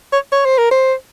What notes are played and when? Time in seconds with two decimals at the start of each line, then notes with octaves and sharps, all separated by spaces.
0.12 C#5
0.32 C#5
0.45 C5
0.58 A#4
0.71 C5